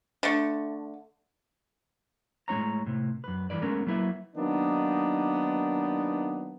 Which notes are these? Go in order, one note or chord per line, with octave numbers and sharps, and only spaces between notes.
D3 A3
A2 G#3 D4 C#5 A#5
A2 C3
F#2 B4
G2 C3 E3 B4 D5
G#3 A3 B3 C#4 A#4
F#3 A#3 E4 F#4 B4 E5
D#3 F#3 A#3 B3 D4 D#4